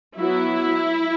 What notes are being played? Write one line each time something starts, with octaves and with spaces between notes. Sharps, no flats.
F#3 B3 E4